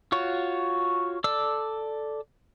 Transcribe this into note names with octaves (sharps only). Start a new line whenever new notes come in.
F4 F#4 C#5
A4 D5 E6